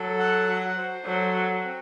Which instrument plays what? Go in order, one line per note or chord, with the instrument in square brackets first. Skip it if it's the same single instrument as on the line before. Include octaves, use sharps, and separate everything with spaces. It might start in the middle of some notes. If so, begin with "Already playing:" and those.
Already playing: [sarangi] F#3 [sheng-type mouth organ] A4
[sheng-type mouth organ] F#5
F#4
C5
[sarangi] F#3 [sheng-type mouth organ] A4
[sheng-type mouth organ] F#4
C4